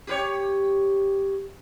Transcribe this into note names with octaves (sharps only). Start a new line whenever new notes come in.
G4 B4 C#5